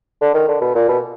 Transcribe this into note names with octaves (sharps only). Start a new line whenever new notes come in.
D3
D#3
D3
B2
A#2
B2